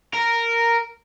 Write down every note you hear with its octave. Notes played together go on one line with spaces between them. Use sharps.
A#4